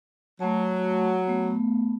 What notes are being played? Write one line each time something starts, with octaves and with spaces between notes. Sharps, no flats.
F#3 A3 A5
A3 B3